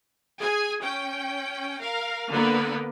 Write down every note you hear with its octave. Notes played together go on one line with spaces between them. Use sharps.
G#4 G#5
C#4 G5
A#4 F5
D3 A#3 B3 B4